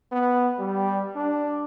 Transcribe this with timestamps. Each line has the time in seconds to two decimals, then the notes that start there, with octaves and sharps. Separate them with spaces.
0.12 B3
0.59 G3
1.16 D4